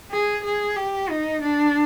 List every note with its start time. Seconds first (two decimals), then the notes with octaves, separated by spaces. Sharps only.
0.11 G#4
0.44 G#4
0.76 G4
1.10 D#4
1.42 D4